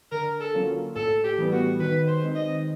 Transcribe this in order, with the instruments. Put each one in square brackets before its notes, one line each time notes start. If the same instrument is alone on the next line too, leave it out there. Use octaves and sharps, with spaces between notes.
[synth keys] D3 [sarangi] A#4
[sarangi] A4
[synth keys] F#3 A#3 C#4 F4
[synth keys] A2 [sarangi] A4
[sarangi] G4
[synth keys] E3 G3 B3
[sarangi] F#4
[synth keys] D#3 [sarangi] B4
[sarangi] C5
[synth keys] G#3 C4 D#4
[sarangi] D#5